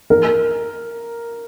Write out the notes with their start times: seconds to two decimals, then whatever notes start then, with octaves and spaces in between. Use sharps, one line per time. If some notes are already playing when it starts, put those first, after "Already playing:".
0.10 A#4